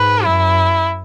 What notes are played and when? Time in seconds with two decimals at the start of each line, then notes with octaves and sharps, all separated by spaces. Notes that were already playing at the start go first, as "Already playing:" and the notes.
Already playing: G#2 B4
0.24 F#2 E4